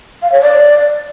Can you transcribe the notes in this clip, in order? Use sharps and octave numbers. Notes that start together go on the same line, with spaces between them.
F5
C#5
D5